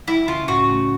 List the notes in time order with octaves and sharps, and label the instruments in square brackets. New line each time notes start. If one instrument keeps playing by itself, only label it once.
[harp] G3 [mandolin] E4
[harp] C#2 [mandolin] F4
[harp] A2 [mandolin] F#4
[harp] A3